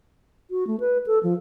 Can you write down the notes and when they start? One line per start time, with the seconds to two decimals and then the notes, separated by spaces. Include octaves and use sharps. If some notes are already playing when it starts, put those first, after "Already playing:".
0.51 F#4
0.67 A3
0.80 B4
1.07 A4
1.23 F3